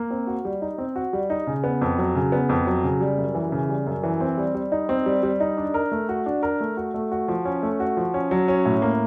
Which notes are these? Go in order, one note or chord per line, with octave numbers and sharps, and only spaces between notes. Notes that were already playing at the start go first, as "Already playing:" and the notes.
Already playing: A#3
C4
F#4
G3
D#4
C4
F#4
G3
D#4
C#3
B3
F2
F#3
C#3
B3
F2
F#3
C#3
G3
F#2
E3
C#3
G3
F#2
E3
C4
G3
G3
D#4
C4
G3
G3
D#4
D4
A#4
A3
F#4
D4
A#4
A3
F#4
A3
F#4
F3
C#4
A3
F#4
F3
C#4
F#3
C#4
A2
A#3